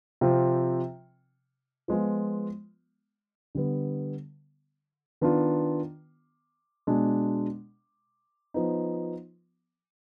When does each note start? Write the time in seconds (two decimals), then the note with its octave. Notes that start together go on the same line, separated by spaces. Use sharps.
0.21 C3 F3 C4 F4
1.88 F3 G#3 B3 F4
3.55 D3 G3 B3
5.21 D#3 B3 D4 F4
6.87 B2 G#3 D4
8.54 F3 B3 D#4